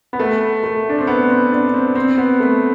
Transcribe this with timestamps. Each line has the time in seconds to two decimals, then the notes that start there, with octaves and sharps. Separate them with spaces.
0.13 B3
0.19 A3
0.64 A3
0.89 D4
0.98 C4
1.07 B3
1.30 C4
1.52 D4
1.69 D4
1.74 C4
1.95 C4
2.18 B3
2.40 A3